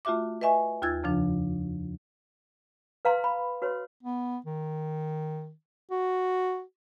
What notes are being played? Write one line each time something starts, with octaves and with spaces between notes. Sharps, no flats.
A3 F4 F#4 E5 D6
B4 D#5 E5 G#5 C#6
D#2 F4 E6 G#6 A6
F2 C#3 F3 D4
B4 F5 A#5 C6
B5
F#4 B4 C#5 C6
B3
D#3
F#4